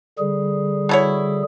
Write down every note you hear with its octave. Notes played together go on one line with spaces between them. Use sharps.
D3 G3 G#4
B2 E4 C#5